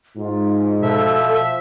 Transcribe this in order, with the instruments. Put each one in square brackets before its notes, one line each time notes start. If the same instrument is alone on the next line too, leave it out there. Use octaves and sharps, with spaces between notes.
[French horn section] G#2 [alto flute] F4
[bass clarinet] B2 [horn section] F3 E5 [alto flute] A4